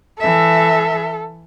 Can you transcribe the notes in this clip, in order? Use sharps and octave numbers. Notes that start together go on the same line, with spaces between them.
E3 A4 E5